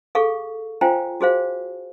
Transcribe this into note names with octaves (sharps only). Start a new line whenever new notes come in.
G#4 A4 F5 C#6
F4 C5 F5 G5 G#5 A#5
F#4 G#4 C5 F5